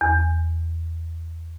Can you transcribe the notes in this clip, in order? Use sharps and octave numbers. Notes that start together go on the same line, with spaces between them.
E2